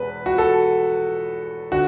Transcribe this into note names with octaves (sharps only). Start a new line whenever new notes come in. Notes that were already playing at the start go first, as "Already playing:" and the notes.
Already playing: E1 E2 B4
F#4
A4
D3 F#4